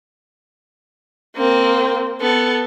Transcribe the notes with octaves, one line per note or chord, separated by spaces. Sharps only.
A#3 C4
B3 A4